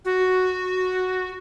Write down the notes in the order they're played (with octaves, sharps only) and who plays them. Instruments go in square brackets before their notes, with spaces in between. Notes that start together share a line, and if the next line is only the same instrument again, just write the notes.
[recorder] F#4